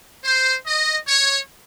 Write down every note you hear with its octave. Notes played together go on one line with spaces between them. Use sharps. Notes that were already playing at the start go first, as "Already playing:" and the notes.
C5
D#5
C#5